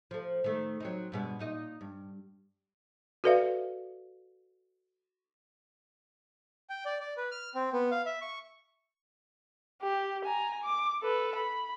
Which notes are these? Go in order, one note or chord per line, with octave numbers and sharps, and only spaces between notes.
F3 A3
D#3 A3
F#3 C4 D#4
G2 B2 G#3
A#2 D#4 D#5
G2
F#4 A4 B4 D5 E5 F5
G5
D5
D5
B4
F6
C4
B3
F5
E5
C#6
G4
G#5 A#5
D6
A4 B4
B5